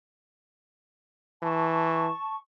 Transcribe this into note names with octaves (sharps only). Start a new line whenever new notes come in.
E3 A5 C#6